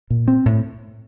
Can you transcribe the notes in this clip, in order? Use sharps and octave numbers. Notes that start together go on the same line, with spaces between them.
A#2
C4
A2